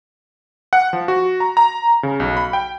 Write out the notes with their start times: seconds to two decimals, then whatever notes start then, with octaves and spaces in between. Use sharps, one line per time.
0.73 F#5
0.93 F3
1.08 F#4
1.40 A#5
1.57 A#5
2.03 C#3
2.20 B1
2.37 B5
2.53 G5